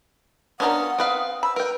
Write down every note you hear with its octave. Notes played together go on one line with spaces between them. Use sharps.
B3 C#4 D4 F4 A#4 F#5 D#6
C4 B4 F5
B5 E6
A#4 B4 G5